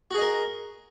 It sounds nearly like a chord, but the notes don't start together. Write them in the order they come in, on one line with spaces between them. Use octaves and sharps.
F#4 G#4 D#5 A#4